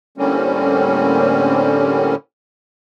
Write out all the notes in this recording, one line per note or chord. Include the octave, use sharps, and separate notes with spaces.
A2 D3 G3 A#3 C4 C#4